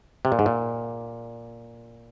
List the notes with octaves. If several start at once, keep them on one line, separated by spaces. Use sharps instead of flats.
C3
A#2
G#2
A#2